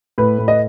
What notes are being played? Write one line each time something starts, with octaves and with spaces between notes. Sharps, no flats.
A2 B4
A2
D#5